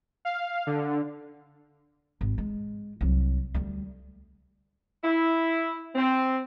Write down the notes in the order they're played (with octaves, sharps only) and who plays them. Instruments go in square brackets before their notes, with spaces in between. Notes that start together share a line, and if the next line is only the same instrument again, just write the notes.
[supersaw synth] F5
D3
[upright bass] G#1
G#3
C2 F#3
D2 G3
[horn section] E4
C4